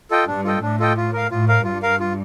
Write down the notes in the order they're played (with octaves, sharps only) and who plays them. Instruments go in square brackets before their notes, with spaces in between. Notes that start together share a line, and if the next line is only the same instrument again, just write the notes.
[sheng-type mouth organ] F4 A4 D#5 G5
[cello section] G2 [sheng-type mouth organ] D4
[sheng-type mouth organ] F4 A4 D#5 G5
[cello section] A2 [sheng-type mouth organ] D4
[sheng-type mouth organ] F4 A4 D#5 G5
F4
A#4 F5
[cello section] A2 [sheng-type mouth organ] F4
[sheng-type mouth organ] A#4 F5
[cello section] G2 [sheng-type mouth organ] F4
[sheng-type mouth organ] A#4 F5
F4